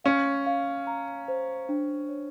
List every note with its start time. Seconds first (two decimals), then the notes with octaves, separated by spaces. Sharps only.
0.04 C#4 F5
0.46 F5
0.87 A#5
1.28 C5
1.69 D4
2.09 C#5